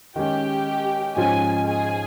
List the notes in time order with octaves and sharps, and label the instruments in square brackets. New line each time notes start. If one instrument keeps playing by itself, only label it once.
[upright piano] D#3 G#3 C#4 [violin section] G4 G5
[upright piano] G#2 F3 G#3 C#4 F4 [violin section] G#4 G#5
[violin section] G#4 G#5